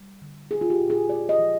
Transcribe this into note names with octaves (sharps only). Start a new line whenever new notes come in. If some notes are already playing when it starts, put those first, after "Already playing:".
Already playing: G3
D3
G#3 G#4
F4
G4
A#2
G#4
G#3 D5
D#5
F3